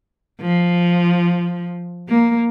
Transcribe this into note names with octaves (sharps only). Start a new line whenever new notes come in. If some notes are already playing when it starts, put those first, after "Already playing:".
F3
A#3